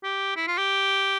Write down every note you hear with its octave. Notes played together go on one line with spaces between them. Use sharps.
G4
E4
F4
G4